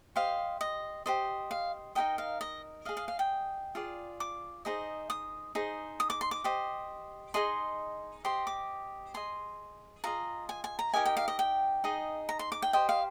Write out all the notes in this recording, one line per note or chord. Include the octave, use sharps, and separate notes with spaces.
G4 C5 D#5 F5
D#5
G4 C5 D#5
F5
D#4 G4 A#4 D#5 G5
F5
D#5
G#4 D#5 F5
F5
F5
G5
F4 G#4 D5
D6
D#4 G#4 C5 D#5
D#6
D#4 G#4 C5
D#6
D6
C6
D6
G4 C5 D#5
D#4 G#4 D#5 C6
G4 C5 D#5 C6
D6
G#4 D#5 C6
F4 G#4 D#5 A#5
G#5
G#5
A#5
D#4 G4 A#4 D#5 G#5
G5
F5
D#5
G5
D#4 G#4 D#5
A#5
C6
D6
G5
G4 C5 D#5 G5
F5